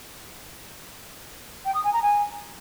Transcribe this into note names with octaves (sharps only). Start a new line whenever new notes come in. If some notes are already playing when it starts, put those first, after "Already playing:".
G5
D#6
G#5
A#5
G#5